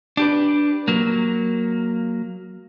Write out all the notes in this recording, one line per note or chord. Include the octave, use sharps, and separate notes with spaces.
D4 G4 B4
F#3 A#3